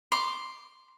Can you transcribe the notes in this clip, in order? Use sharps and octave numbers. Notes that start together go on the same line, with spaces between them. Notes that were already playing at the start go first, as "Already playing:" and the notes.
C6 D6